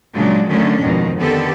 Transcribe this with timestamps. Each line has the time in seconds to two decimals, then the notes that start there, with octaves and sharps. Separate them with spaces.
0.13 A#2 C#3 F#3 G#3 D4
0.49 D3 D#3 F#3 A3 C#4 D4
0.82 F2 G#2 B2 D#3
1.19 D3 D#3 B3 G4 A4